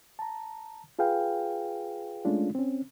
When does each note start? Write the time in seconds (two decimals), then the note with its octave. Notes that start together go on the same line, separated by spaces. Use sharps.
0.19 A5 A#5
0.99 F4 G#4 B4 F5 G5
2.25 G#3 A3 C#4 D4 F4
2.55 C4 C#4